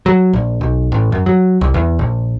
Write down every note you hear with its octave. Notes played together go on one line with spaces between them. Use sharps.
F#3
A#1
B1
A1
F#2
F#3
C2
E2
A#1